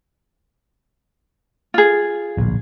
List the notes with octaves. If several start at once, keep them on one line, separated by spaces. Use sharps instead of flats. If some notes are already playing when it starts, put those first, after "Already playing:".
F4 G#4
D1 A#1